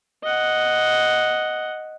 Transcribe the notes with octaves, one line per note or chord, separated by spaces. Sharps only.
D#5 F#5